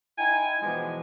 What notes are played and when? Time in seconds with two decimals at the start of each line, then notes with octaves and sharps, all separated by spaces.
0.18 D#4 E4 G5 G#5
0.62 B2 E3 F3 G#3 D4